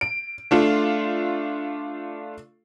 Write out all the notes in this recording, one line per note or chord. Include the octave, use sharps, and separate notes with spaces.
D7
A3 D4 F4